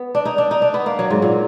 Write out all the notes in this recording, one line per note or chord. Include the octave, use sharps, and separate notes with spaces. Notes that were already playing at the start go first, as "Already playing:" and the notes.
Already playing: B3
D4
D#4
D4
D#4
D4
B3
A#3
F#3
G#2
A#2